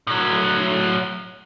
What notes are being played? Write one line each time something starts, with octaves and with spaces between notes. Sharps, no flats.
A2 F#3